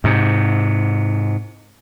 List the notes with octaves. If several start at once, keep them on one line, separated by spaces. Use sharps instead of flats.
G#2 C3